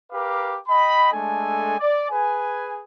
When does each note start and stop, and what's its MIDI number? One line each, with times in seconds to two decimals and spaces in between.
0.12 0.58 67
0.12 0.58 70
0.12 0.58 71
0.12 0.58 77
0.12 0.58 86
0.68 1.09 75
0.68 1.09 79
0.68 1.09 83
1.13 1.78 56
1.13 1.78 57
1.13 1.78 62
1.13 1.78 69
1.13 1.78 80
1.79 2.09 74
2.10 2.82 68
2.10 2.82 71
2.10 2.82 80